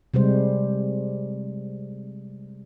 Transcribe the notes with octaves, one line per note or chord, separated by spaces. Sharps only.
C3 G3 G#3 C5